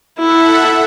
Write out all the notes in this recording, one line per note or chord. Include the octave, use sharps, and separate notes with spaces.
E4 A4 E5 F#5